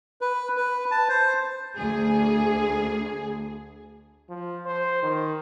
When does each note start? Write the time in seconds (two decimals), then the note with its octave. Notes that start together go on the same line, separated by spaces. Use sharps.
0.21 B4
0.57 B4
0.91 A5
1.09 C5
1.78 D2 G#4
4.30 F3
4.66 C5
5.03 D#3